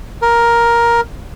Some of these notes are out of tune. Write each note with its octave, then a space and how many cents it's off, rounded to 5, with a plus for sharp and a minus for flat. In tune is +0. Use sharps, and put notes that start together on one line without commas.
A#4 +10